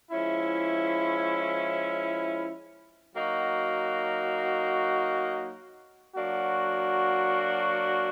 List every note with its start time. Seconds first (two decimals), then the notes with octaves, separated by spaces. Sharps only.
0.11 F3 G#3 C#4 E4
3.14 F#3 A#3 D#4 F#4
6.16 F#3 A#3 D4 F#4